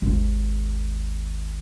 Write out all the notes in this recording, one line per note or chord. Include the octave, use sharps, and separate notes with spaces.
G#1 D#2